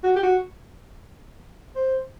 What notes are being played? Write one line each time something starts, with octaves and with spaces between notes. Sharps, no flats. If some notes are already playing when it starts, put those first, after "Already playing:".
F#4
G4
F#4
C5